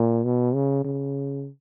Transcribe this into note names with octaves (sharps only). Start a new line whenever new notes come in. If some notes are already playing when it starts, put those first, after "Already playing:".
Already playing: A#2
B2
C#3
C#3